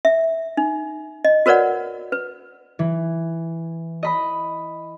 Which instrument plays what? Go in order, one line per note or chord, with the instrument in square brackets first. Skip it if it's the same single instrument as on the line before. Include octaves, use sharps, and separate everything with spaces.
[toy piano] E5
D#4
D#5
F#4 A#4 B4 C#5 D5 F#5
B4
[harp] E3
D#5 B5